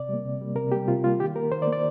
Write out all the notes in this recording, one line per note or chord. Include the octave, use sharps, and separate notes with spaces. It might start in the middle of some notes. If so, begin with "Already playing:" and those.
Already playing: C3 D5
G3 A#3
C3
G3 A#3
C3 A#4
G3 A#3 G4
C3 F4
G3 A#3 F4
D#3 G4
A#3 A#4
D#3 C5
D5
A#3
D5